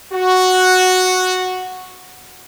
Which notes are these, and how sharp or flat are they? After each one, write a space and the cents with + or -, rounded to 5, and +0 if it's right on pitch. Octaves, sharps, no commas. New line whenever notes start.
F#4 -5